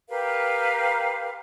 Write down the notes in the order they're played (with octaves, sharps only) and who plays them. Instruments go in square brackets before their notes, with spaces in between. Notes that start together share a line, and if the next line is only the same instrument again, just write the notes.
[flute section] G4 A#4 B4 F5